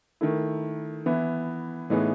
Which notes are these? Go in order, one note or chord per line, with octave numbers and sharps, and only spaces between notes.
D#3 A3 E4
E3 B3 E4
A2 E3 B3 D#4 G#4